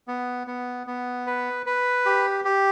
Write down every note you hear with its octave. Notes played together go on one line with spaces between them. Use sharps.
B3
B3
B3
B4
B4
G4
G4